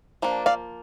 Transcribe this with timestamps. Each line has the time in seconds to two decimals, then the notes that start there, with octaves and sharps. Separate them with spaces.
0.22 F3 A#3 D4
0.46 D5 F5